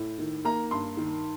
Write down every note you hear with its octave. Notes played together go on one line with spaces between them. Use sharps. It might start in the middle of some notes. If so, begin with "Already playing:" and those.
Already playing: A2
D#3
A#3 A#5
G2 C6
D#3